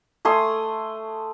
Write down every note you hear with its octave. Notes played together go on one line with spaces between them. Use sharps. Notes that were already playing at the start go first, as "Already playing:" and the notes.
A3 G#5 C6 D#6